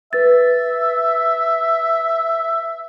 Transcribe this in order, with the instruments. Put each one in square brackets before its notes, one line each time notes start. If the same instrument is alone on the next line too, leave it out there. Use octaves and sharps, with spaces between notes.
[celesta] B4 A6 [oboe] E5